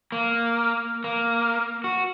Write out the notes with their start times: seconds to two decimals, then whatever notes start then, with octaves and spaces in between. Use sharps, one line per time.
0.12 A#3
1.04 A#3
1.84 F#4